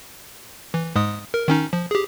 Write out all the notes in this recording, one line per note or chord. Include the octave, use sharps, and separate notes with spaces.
E3
G#2 G#3 D#6
A#4
D#3 C#4 D#4
F3
G4 G#4